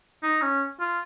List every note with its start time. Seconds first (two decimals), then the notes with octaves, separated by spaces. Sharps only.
0.23 D#4
0.42 C#4
0.80 F4